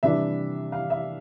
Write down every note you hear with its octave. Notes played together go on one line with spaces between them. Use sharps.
C3 E3 G3 D4 E5
F5
E5